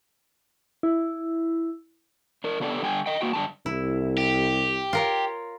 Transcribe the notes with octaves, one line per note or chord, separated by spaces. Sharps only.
E4
D4 A#4
C#3 B3 D4 G4 A4
D3 G3 G5 G#5
D#5 G5
A#3 F#4 G5
G2 D3 A3 G5 A5
C2 E4
G4
F4 A#4 C#5